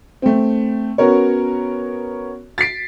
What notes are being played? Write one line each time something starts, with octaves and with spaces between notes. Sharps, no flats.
A3 C4
B3 C#4 F#4 A#4 C#5
A6 B6 C7 D7